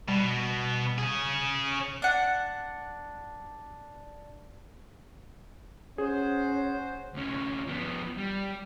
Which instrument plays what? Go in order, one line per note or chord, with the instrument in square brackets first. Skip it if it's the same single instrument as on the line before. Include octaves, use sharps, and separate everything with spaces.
[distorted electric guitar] B2 [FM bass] G3
[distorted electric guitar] C#4 G#4
[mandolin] D4 F#5
[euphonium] C#4 [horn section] F#4 C5 [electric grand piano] G#4
[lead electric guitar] D2 C#4
F3 B3
G3